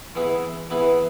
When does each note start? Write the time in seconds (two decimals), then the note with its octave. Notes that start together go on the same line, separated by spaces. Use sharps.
0.15 E3 B3 E4 G#4
0.70 E3 B3 E4 G#4